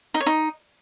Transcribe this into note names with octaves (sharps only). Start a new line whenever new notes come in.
D#4
C#5
D#4